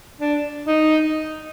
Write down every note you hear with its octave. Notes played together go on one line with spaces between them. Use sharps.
D4
D#4